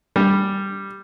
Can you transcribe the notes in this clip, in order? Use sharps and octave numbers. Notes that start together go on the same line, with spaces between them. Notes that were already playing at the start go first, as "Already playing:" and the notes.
G3